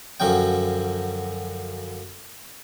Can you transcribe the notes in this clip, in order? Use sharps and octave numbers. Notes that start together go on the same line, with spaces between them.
F#2 D3 F3 F#3 C#4 G5